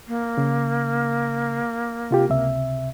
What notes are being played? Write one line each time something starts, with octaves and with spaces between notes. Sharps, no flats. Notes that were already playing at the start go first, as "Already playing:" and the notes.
A#3
C#3
C3 F4 G4
C#2 C3 E5